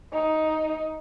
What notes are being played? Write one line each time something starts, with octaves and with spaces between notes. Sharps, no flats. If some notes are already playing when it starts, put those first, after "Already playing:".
D#4